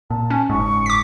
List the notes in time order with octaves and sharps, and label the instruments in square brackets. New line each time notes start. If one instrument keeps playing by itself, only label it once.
[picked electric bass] A#2 [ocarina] A5
[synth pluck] C#4
[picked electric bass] F#1 G#2 [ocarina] C#6
[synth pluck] D6 B6